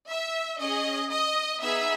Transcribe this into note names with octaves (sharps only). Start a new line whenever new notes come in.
E5
C#4 G#4 D#5
D#5
B3 D#4 G#4 E5